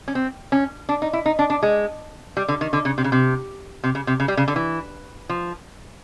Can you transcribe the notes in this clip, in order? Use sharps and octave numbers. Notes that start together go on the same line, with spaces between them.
C#4
C4
C#4
D4
D#4
E4
D#4
D4
D4
G#3
G3
D3
D#3
D3
C#3
C3
C#3
C3
C3
C#3
C3
C#3
G3
C#3
D3
E3
F3